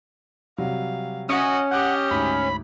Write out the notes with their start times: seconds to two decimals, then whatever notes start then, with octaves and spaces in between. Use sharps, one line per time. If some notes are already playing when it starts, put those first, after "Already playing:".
0.58 C3 F#3 G3 F5
1.29 C#4 F#4 D#5 E5 D#6 C#7
1.71 G4 D#5 F#5 D6 F#6 G6
2.11 D2 G#2 B5